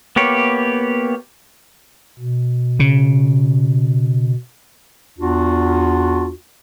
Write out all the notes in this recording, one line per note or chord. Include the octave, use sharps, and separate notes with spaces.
A#3 B3 G4 C#5
B2
C#3
E2 D4 F4 F#4